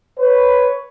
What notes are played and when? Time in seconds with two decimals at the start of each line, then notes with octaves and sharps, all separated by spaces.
0.19 B4 C#5